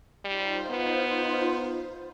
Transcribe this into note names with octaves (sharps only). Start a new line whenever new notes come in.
G3 D#4 F4 C5
B3